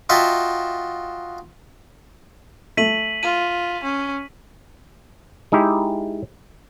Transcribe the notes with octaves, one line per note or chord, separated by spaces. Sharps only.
F4 F#4 D#5 E5 G5 A5
A3 B6 D#7 F#7
F4 D#7
C#4
G#3 D#4 E4 G4